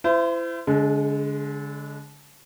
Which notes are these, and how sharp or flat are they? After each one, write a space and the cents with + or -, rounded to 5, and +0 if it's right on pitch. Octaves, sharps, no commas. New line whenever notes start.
E4 +30 C5 -30
D3 -35 G#3 +10